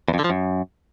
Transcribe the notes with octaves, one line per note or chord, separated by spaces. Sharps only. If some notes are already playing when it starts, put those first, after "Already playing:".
E2
F2
D3
F3
F#2